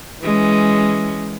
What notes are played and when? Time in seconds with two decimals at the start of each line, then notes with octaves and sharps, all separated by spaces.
0.21 E3 G#3 C#4